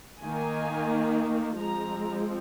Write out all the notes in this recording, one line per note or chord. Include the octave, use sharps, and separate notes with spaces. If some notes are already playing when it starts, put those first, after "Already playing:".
D#3 A#3 G#5
F3 G#3 C4 A#5